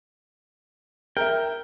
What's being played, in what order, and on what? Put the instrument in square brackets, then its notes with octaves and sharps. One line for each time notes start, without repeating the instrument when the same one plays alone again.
[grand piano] A#4 E5 [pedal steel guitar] G5